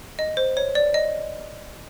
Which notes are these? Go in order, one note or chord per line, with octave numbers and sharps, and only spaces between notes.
D#5
C5
C#5
D5
D#5